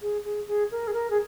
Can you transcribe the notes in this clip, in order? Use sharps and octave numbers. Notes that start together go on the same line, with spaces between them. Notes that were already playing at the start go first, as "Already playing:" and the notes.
G#4
G#4
G#4
A#4
G#4
A#4
G#4